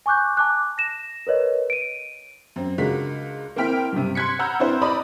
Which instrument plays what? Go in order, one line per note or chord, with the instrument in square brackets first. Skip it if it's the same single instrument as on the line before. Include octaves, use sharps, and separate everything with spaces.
[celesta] G#5 C#6 D6 F#6 G6
A5 D6 F#6
A#6 E7
A#4 B4 C#5 D#5
D7 D#7
[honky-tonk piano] F#2 C4
C#2 G#3 D4 F#4 A#4 B6
A#3 C4 E4 G5 F6 B6
G2 C3
C6 F#6 G#6 B6 C#7
F#5 A#5 B5 E6 F6 G6
C4 D4 E4 B4 C5
D5 D#5 A#5 B5 D#6